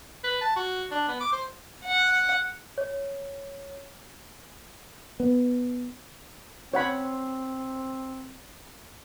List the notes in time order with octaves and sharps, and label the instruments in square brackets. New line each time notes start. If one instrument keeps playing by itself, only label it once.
[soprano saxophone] B4
A5
F#4
D4
B3
D6
C5
[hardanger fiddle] F#5
[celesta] C#5
[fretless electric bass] B3
[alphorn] C4 [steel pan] C#5 F#5 B5